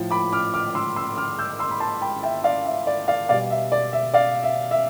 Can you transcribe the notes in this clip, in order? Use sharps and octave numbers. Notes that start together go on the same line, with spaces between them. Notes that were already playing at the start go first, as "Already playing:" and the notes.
Already playing: A2 F3
B5 D6
D6 F6
D6 F6
C6 E6
C6 E6
D6 F6
E6 G6
C6 E6
B5
A5 C6
G5 B5
E5 G5
D5 F5
E5
D5
D5 F5
B2 G3 D5 F5
E5
D5
E5
D5 F5
E5
E5